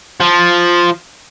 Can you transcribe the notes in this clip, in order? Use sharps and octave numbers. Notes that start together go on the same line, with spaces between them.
F3